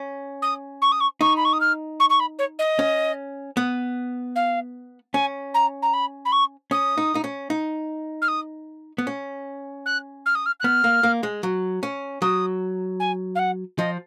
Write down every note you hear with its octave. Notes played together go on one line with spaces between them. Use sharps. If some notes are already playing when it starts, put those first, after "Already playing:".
Already playing: C#4
D#6
C#6
D#6
C#6
D#4 C#6
B5
C#6
D#6
F6
C#6
C#6
B5
C#5
D#5
C#4
B3
F5
C#4 G#5
A#5
A#5
B5
B5
C#6
C#4 D#6
D#4
D#4
C#4
D#4
F6
D#6
B3
C#4
F#6
F6
D#6
F6
F#6
B3 F6
A#3
A#3
G#3
F#3
C#4
F#3 D#6
G#5
F5
F#5
F3 D#5